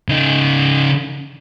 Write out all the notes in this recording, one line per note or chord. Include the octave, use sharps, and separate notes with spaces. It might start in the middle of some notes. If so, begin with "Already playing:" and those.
C#3 D#4